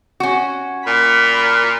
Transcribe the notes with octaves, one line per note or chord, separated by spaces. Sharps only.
C#4 F#4
A#2 B5